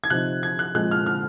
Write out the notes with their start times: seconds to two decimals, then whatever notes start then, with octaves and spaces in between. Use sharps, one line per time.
0.04 G#6
0.10 C3 F3 C4 D#4 F#6
0.43 G#6
0.59 F#6
0.75 A#2 F3 G#3 C4 F#6
0.91 F6
1.06 F6